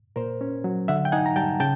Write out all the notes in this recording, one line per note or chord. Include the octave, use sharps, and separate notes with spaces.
A#2 A#4 C5
C#4
F#3
D3 E5 F#5
G5
D#4 F#5 G#5
A#5
G3 G5 A5
C#3 G5 A5